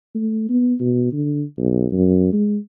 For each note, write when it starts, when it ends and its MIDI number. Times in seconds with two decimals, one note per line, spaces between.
0.15 0.49 57
0.50 0.74 59
0.80 1.09 47
1.13 1.43 50
1.58 1.86 35
1.92 2.28 42
2.33 2.58 56